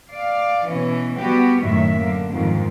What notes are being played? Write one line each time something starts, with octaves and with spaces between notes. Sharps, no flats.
D5 F5
B2 E3 C#4
G3 B3 F#4 G4
F#2 A2 D#3 F#3 E5
D3 A#3
F2 G#2 D#3 F3